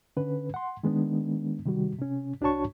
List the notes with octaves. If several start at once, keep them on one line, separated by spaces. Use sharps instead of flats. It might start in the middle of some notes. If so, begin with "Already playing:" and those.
D3 C#4 B4
F#5 C6
D#3 G#3 B3 D4
C3 D#3 G3 F#4
C3 C#4
C2 D4 F#4 C#5 A5 C#6